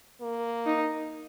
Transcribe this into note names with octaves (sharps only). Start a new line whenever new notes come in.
A#3
D#4